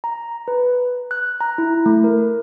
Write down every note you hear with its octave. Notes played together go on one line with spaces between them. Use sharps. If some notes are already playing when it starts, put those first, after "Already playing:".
A#5
B4
F#6
A#5
E4
A3
A#4